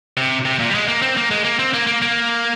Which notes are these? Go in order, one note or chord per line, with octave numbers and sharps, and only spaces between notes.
C3
C3
A#2
G3
G#3
A#3
C4
A#3
G#3
A#3
C4
A#3
A#3
A#3